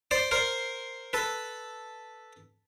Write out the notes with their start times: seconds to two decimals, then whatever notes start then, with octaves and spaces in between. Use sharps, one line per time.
0.11 C5 D5
0.31 A#4 C5
1.13 A4 B4